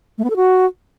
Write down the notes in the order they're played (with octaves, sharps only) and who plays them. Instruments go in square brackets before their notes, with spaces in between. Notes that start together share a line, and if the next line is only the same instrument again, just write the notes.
[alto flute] A3
B3
A4
F#4